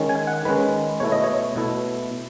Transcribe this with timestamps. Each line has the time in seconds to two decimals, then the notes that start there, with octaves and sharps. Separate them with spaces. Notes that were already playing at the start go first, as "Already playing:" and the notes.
Already playing: D#3 G#3 C#4
0.09 G#5
0.27 F#5
0.45 D#3 G#3 C#4 B4
1.00 B2 A3 E4 C#5
1.12 D#5
1.24 C#5
1.56 B2 A3 E4